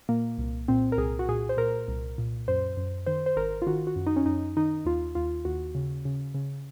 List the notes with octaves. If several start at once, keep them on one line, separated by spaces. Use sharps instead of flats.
A#2 A#3
C2
A#2 C4
A#4
C2 G#4
F#4
A#2 G#4
C5
A#2 A#4
C2
A#2
F#2 C5
F#2
D#3 C5
C5
G#1 A#4
F4
D#3 F#4
F#4
F#2
D#4
C#4
F#2 D#4
D#3 D#4
D#2 F4
D#2 F4
D#2 F#4
C#3
C#3
C#3